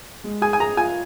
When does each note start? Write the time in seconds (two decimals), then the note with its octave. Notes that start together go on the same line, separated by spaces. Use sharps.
0.24 G#3
0.42 G#4 G#5
0.53 G#5
0.60 G#4 A#5
0.77 F4 G#5